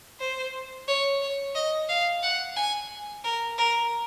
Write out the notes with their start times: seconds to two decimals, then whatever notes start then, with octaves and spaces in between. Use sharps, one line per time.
0.20 C5
0.88 C#5
1.21 C#5
1.55 D#5
1.89 F5
2.23 F#5
2.56 G#5
3.24 A#4
3.58 A#4